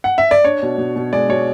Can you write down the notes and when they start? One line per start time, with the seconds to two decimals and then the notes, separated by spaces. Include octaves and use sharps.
0.04 F#5
0.18 E5
0.31 D5
0.45 D4 C#5
0.63 B2
0.78 B2
0.96 B2
1.13 G#3 D5
1.29 B2 C#5